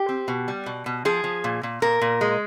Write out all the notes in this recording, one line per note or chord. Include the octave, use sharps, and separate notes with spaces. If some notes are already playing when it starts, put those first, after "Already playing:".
Already playing: G4
C4
B2
G3
B2
B2
F3 G#4
F3
A#2
A#2
A#2 A#4
A#2
G#3